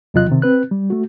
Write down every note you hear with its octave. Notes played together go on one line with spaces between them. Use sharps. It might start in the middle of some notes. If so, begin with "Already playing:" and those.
E2 C3 F#3 F4 D#5 F#6
C3 D#3
C4 B4 F#6
G3
A3 F#4